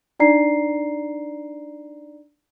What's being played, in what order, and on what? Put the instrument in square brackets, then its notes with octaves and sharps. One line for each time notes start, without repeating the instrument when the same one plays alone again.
[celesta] D4 D#4 D5 A#5 C7